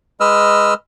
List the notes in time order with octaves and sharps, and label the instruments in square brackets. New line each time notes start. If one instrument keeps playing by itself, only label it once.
[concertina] G#3 B4 D#5 E6 F6